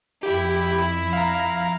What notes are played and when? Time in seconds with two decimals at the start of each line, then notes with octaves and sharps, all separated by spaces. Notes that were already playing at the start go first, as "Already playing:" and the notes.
0.23 F2 E4 G4
1.13 F5 A#5